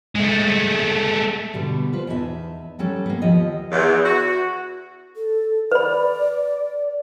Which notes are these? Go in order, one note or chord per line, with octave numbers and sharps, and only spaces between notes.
G#3 A3
B2 D3 G3
F4 B4 C5
E2 D4 D#4 G4 E5 A5
F#3 G3 C#4 A4
A#3 B3
D#2 F3 G4 D#5 F#5
E2
F#4
A4
B4 D5 B5